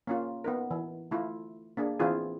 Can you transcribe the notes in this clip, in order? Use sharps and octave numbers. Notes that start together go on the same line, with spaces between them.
A#3 C#4 F4
B3 D#4 A#4
E3
A3 E4 F4
A#3 D4 G#4
E3 C4 E4 F4 G#4